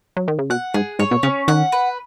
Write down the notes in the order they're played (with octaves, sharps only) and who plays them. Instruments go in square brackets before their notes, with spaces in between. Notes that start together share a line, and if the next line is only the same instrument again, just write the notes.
[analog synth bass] F#3
D#3
C#3
[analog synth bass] B2 [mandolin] F#5
[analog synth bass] G#2 [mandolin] G#4
[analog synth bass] G#2 [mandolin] C#5
[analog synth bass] B2
[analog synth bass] C#3 [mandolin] C#4
[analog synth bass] D#3 [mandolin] F#5
[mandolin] B4